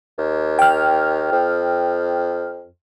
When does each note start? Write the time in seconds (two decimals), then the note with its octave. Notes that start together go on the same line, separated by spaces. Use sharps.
0.18 D#2
0.59 G5 F6
1.32 F2